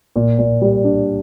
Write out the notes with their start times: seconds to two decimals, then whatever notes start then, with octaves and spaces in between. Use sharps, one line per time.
0.16 A#2
0.39 A#2
0.61 G3
0.84 D4